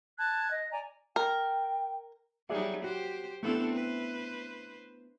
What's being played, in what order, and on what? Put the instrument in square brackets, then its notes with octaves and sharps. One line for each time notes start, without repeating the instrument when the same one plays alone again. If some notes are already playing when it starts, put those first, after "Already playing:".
[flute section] A5 F#6 G#6
D#5
D5 G#5 A#5
[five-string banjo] A#4 [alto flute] G5
[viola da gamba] F#3 G3 D#4 [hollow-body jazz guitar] G#4 D5 E5
[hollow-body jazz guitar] F#4 [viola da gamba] G4 C5
[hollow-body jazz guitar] A3 B3 E4 [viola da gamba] C4 D4 A4
[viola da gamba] B4 C5